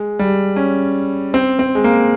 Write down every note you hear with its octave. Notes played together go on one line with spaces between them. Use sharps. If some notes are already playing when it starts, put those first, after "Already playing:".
Already playing: G#3
G3
C#4
C4
C4
G#3
A#3